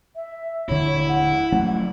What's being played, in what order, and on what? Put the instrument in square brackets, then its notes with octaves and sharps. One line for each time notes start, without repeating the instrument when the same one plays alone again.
[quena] E5
[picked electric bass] D#1 D3 [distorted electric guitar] E4 [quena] C#5
[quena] F#5
[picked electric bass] F#3 A3 C#4